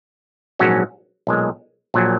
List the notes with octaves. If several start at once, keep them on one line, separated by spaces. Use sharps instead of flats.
A#1 G#2 F#3 C#4 F#4
B1 A#2 G#3
A#1 A#2 F#3